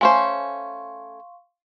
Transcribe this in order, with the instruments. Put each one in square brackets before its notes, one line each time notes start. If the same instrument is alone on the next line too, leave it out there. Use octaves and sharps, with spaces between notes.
[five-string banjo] A3 C#4 C5 [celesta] F5 C6 C#6 [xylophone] G#5